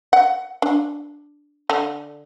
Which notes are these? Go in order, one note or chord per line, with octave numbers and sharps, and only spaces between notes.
F#5
D4
D3